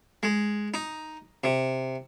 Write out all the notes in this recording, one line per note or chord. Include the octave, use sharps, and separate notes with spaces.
G#3
D#4
C3